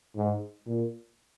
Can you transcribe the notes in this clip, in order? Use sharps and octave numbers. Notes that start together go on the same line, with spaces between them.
G#2
A#2